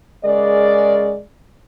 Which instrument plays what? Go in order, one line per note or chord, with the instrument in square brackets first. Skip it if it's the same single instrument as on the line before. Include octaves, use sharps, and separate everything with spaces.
[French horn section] C#3 G#3 A#4 D5